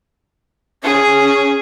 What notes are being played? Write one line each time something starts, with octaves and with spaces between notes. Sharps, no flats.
C#4 G#4